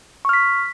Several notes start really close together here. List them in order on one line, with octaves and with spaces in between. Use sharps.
C#6 F6 B6